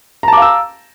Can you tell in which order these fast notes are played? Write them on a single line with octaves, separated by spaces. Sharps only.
A#5 A5 D6 F5 E6